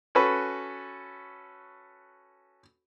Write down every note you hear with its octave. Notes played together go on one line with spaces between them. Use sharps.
C#4 F#4 A4 B4